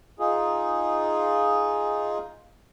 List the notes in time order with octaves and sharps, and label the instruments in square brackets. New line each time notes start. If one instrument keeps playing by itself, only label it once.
[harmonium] D#4 F4 G#4